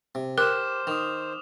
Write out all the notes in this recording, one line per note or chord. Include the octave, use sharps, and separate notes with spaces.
C3
G4 A#4 C5 D6 F6 E7
D#3 D#6 F6 F7